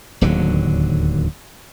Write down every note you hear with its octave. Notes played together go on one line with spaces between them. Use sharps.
D1 D#2 D3 F#3